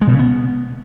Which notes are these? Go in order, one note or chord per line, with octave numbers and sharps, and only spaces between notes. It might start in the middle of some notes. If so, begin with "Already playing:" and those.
G#3
B2
C#3
B3